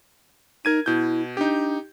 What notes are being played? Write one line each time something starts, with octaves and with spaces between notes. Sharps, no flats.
D#4 A#4 G#6 D#7
B2 E4 G6
D4 D#4 G4